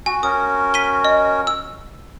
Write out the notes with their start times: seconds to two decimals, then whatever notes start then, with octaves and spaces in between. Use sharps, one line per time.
0.06 F#4 G#5
0.23 C#4 F#4 A#4 D#6
0.74 B6 D#7 G7
1.05 D#5
1.47 E6